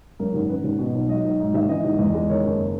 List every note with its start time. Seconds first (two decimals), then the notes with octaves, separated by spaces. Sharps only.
0.19 F#2 A#4
0.34 G#1
0.49 C#3 B4
0.64 G#1
0.79 B2
0.95 B1
1.09 F#3 D#5
1.25 B1
1.39 G#2 D#5
1.54 G#1 E5
1.69 E3 D#5
1.85 G#1
1.99 E2 D#5
2.14 G#3
2.29 D#3 C#5
2.44 F#1